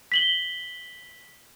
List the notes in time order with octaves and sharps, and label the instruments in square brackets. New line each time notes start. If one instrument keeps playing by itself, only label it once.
[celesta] B6 F#7 G7